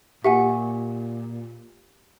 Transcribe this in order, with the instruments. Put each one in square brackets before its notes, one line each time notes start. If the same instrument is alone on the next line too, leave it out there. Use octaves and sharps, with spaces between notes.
[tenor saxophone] A#2 [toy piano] G4 [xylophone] E5 F#5 G#5